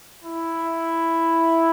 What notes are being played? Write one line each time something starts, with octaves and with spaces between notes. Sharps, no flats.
E4